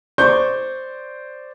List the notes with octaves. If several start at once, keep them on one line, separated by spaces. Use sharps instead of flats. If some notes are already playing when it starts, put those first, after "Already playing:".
C5 D5 C#6 G6